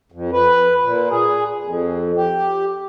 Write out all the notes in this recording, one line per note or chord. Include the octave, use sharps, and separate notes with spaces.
F2
B4
A#2
G#4
F2
G4